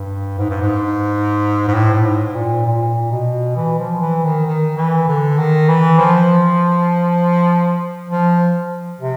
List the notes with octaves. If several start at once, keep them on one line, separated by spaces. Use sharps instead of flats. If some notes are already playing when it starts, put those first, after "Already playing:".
Already playing: G2
G#2
G2
G#2
G#2
A2
A2
G#2
A#2
A#2
B2
E3
F3
E3
D#3
D#3
E3
D3
D#3
E3
F3
F3
C3